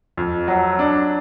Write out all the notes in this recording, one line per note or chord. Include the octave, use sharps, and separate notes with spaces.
F2
F#3
D4